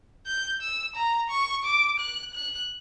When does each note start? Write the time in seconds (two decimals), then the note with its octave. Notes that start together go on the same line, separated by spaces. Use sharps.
0.26 G6
0.61 E6
0.96 A#5
1.30 C#6
1.64 D6
1.99 F#6
2.34 F#6